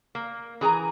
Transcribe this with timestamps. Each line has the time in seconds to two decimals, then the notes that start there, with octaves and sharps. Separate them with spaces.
0.15 A#3
0.61 E3 G#4 G#5 A#5